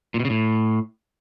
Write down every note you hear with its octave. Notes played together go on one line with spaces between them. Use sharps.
A#2
B2
C#3
A2